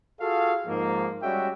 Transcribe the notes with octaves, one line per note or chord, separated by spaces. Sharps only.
F4 F#4 G#4 A4 F5
G#2 F3 A#3
G3 G#3 C#4 F#4 E5 G5